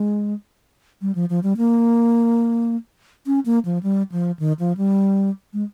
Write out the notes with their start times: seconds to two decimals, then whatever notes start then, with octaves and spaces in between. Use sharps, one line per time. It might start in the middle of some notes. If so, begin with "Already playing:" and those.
Already playing: G#3
1.01 G3
1.15 F3
1.30 F3
1.43 G3
1.57 A#3
3.26 C#4
3.46 A#3
3.65 F3
3.83 G3
4.12 F3
4.39 D#3
4.59 F3
4.77 G3
5.53 G#3